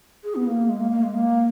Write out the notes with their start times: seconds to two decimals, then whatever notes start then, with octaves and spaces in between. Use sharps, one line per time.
0.24 G#4
0.35 B3
0.46 A#3
0.69 G#3
0.80 A#3
0.91 A#3
1.03 G#3
1.14 A#3